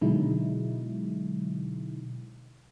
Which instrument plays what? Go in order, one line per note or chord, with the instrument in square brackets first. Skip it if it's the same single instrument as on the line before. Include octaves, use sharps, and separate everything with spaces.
[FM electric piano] B2 D3 F#3 G#3 D#4 E4